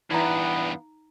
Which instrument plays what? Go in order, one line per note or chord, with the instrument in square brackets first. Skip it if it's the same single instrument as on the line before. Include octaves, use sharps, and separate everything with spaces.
[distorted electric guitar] E2 G2 [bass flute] E3 [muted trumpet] B3 [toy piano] D#4 A#5